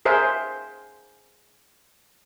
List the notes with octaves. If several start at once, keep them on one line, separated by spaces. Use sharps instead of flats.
G#4 A#4 C5 E5